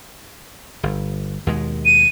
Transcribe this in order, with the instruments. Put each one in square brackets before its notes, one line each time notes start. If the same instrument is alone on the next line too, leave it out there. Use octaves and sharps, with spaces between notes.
[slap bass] G1
D#2 B2 G#3
[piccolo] D#7